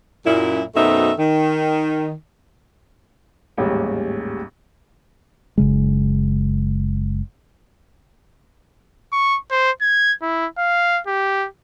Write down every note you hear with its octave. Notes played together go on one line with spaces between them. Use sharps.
F#2 A#2 E4
F#2 B2 A3 C4 D#4 E5
D#3
A1 D#2 G#2 G3 G#3
F#1 C#3 G#3
C#6
C5
G#6
E4
F5
G4